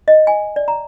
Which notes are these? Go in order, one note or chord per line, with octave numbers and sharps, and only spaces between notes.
D#5
G#5
D5
A#5